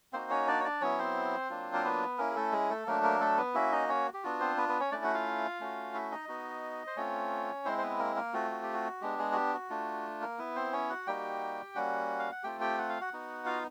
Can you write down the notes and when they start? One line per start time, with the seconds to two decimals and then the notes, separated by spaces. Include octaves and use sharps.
0.13 A#3 C4 D#4 F#4 C5
0.30 C#4 C#5
0.48 D4 D5
0.60 C#5
0.64 D4 D5
0.81 F#3 B3 C#4 E4 C#5
0.99 C4 C5
1.50 F#3 A#3 D4 F4
1.73 A#4
1.84 B3 B4
2.18 A#3 C#4 E4 A#4
2.30 G#4
2.36 A3 A4
2.52 G#3 G#4
2.70 A3 A4
2.86 F#3 A3 A#3 D4 A#4
3.03 A#3 A#4
3.20 A3 A4
3.37 B3 B4
3.54 A#3 C#4 E4 F#4 E5
3.72 D#4 D#5
3.89 C#4 C#5
4.14 G4
4.23 B3 D4 F4 F#4
4.40 C4 C5
4.57 B3 B4
4.69 B3 B4
4.80 C#4 C#5
4.91 A3 C#4 D4 E4 D5
5.03 F#4 F#5
5.14 F4 F5
5.60 A3 C#4 F#4
5.94 E4 E5
6.12 D#4 D#5
6.28 B3 D#4 F#4
6.87 C5
6.97 A3 C4 C#4 F4 C#5
7.65 G#3 C4 E4 C5
7.78 C5
7.82 B3 B4
7.99 A#3 A#4
8.16 A#3 A#4
8.33 A3 C4 F4 F#4
8.50 F#4
8.63 G4
8.73 F#4
9.01 G#3 B3 D4 G4
9.19 G#3 G#4
9.32 F#4
9.36 G4
9.53 F#4
9.70 A3 D4 F4
10.21 A#3 A#4
10.38 B3 E4 B4
10.56 C4 C5
10.72 C#4 C#5
10.89 F#4 F#5
11.07 G3 A#3 D#4 F#4 G4 G5
11.75 G3 A#3 C#4 F#4 F#5
12.19 F5
12.32 F#5
12.43 A3 C4 F4 G4 G5
12.61 G4 G5
12.78 F#5
12.89 F5
13.01 F#4 F#5
13.13 B3 D#4 F#4
13.46 F4 F5